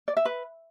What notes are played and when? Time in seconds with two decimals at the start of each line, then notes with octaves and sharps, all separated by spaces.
0.08 D5
0.17 E5
0.25 B4